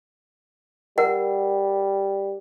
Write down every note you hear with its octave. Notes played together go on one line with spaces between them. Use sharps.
G3 A#4 F#5